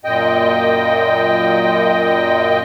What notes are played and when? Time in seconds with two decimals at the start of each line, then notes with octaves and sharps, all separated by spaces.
0.04 F#2 A#2 D#5 G5